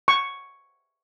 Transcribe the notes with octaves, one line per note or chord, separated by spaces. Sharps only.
C#6